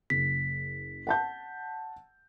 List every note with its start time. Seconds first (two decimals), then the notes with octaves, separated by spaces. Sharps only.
0.10 F#1 B6
1.07 F#5 A5 G6